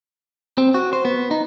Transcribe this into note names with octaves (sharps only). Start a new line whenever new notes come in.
C4
F#4
C5
B3
D#4